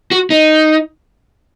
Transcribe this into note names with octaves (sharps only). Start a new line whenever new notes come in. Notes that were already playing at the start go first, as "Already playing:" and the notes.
F#4
D#4